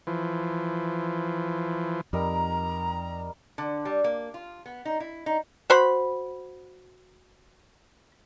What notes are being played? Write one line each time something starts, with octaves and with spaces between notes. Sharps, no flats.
E3 F3
F2 G3 D#4 A#4 A#5
D3
G3
A#3
F4
B3
D#4
E4
D#4
F#4 C5 B5